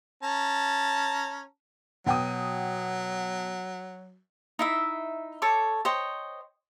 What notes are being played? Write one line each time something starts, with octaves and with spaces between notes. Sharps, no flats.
C#4 A5 A#5
B2 F#3 G5 D#6
D#4 E4 E5
A4 C#5 D6
C5 C#5 D#5 G5